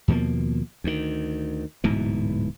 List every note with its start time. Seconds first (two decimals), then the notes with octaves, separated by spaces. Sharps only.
0.08 D#2 B2 F3 A#3
0.84 D2 D#3
1.84 D1 G#2 B2 E3